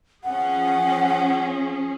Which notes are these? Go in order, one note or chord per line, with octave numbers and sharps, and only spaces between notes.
F3 C#4 G#4 F#5